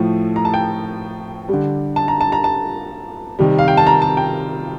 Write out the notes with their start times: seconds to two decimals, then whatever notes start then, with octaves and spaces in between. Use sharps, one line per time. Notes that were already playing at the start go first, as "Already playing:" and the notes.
Already playing: A2 F3 A3
0.36 A#5
0.45 A5
0.54 G5
1.49 D3 G3
1.96 A5
2.08 A#5
2.21 A5
2.32 A#5
2.44 A5
3.39 C3 D#3 G3
3.59 F5
3.68 G5
3.77 A5
3.87 A#5
4.02 A5
4.17 G5